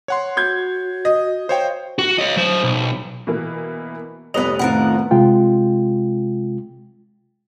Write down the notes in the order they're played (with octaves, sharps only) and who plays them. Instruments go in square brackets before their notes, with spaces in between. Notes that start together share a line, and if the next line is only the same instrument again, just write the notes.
[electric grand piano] C#5 F#5 C6
[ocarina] F#4 [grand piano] G6 G#6
[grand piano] D#5
[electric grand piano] C5 C#5 G5 [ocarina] F5
[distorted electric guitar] F#4
C#5 D#5
F#3 C5
B1
[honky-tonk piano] B2 E3 A#3
[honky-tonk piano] F1 B3 F7 [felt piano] G3 C#5 B5 [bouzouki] B4 D#5
[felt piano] F2 A2 D#3 [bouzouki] F3 A#4 F#5
[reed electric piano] C3 G#3 F4 G5